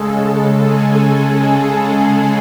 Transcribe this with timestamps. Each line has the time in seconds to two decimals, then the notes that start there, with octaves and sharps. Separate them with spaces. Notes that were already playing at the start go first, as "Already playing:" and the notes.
Already playing: C#3 G#3 A4
0.58 G#4
1.01 A4